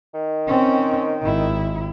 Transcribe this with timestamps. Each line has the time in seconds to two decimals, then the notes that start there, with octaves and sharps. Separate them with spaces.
0.14 D#3
0.47 C4 C#4
1.22 G#1 E4